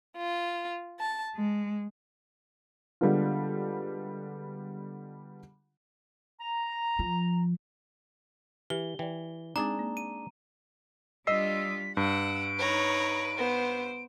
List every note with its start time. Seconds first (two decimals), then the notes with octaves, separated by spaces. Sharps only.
0.17 F4
1.00 A5
1.35 G#3
3.01 D3 G3 G#3 B3 D4 F4
6.40 A#5
6.99 F3
8.70 E3 G4 G7
8.99 E3 D5 G5
9.56 G#3 C4 D4 D#4 G#4 D5 A#5
9.79 A#3
9.97 D#7
11.27 G3 D4 F4 D#5 E6 B6 C7
11.97 G2 F#5 E6 D7
12.59 D#4 B4 C#5 A#5
13.37 B3 C5